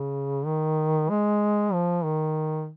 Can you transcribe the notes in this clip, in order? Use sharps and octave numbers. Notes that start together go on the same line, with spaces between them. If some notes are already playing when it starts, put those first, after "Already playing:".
Already playing: C#3
D#3
G#3
F3
D#3